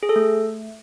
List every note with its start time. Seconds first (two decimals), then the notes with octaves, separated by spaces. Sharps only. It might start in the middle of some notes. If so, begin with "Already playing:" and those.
0.03 G#4
0.09 A4
0.16 A3